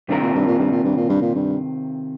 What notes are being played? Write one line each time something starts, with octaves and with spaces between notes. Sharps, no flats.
G2 C3 D#3 C4 F4 A#4
A#2
G2
A#2
G2
A#2
G2
A#2
G2
A#2
G2